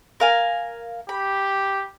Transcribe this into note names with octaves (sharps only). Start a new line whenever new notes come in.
A#4 F5 G#5
G4 B5